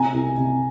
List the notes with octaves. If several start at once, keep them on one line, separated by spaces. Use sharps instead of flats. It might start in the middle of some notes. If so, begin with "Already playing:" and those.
Already playing: C3 G#5 A#5
C2
C3